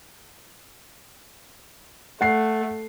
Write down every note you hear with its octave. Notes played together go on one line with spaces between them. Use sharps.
A3 F#5 C7